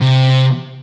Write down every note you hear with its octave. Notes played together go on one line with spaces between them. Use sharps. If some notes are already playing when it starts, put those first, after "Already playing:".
C3